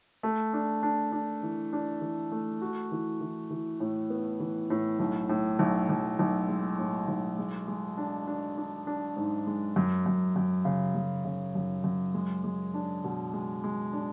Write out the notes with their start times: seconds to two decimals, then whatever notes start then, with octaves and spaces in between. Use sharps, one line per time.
0.23 A3
0.53 D4
0.83 D4
1.12 D4
1.43 E3
1.73 D4
2.01 E3
2.32 A3
2.61 F#4
2.92 E3
3.21 E3
3.50 E3
3.80 A2
4.10 B3
4.40 E3
4.70 A2
4.99 B1
5.29 A2
5.59 B1
5.89 B1
6.19 B1
6.48 G#3
6.79 A2
7.08 B1
7.38 G#3
7.68 G#3
7.98 D4
8.27 D4
8.58 D4
8.87 D4
9.17 G#2
9.47 G#3
9.76 F#2
10.06 F#2
10.36 F#2
10.65 C#3
10.95 F#2
11.25 C#3
11.55 F#2
11.84 F#2
12.14 G#3
12.44 G#3
12.74 D4
13.04 B2
13.33 G#3
13.64 G#3
13.93 D4